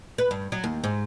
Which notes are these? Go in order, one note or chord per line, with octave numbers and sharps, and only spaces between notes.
B4
G2
F#3
D#2
G#2